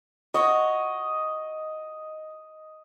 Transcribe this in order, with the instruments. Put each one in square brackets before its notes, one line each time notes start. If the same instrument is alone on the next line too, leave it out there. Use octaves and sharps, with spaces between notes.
[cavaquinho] F#4 C#5 F#5 [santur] D#5